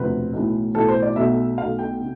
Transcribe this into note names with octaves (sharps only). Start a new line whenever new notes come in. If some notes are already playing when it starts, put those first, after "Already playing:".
Already playing: E1 D2 C3 F3 C4 B4
B1 A2 E3
B1 A2 E3 A4
C5
D5
B1 B2 A3 E5
B1 B2 A3 F5
G5
C3